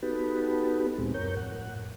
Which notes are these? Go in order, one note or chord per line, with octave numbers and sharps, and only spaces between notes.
B3 D#4 F#4 G4 A4 B4
D2 A#2 G#3 C4
F#2 A#4 C#5 G6
F2 A2 F#5